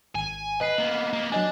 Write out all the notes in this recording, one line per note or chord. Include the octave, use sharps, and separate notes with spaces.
G#1 G#5
B4 D#5 C7
A#3 B3
A#3 B3
F#3 D4 D#5 G#5